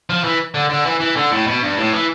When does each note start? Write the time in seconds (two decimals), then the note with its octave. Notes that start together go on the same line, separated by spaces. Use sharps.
0.10 F3
0.24 E3
0.54 D3
0.70 D3
0.85 E3
1.00 E3
1.16 D3
1.32 A2
1.47 B2
1.62 G2
1.77 A2
1.92 E3